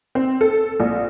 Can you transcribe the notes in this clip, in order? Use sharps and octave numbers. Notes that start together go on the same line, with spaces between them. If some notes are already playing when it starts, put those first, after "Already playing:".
C4
A4
A#1